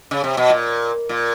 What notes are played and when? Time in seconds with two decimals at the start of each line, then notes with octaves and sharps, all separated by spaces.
0.11 C#3
0.24 C3
0.37 B2
0.50 A#2
1.09 A#2